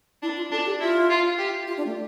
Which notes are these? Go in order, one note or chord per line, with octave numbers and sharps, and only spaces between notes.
D4 E4
F4
D4 A4
G4
E4 F4
F4
G4
F4
D4
A3